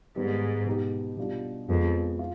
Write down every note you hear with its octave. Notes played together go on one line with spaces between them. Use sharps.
G#2 D#3 G3 B3
B2 B3 D#4 G4
B2 G3 D4 F4
F2 F3 G#3 B3
F4